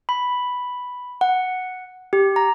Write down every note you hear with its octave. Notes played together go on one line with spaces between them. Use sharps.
B5
F#5
G4
A#5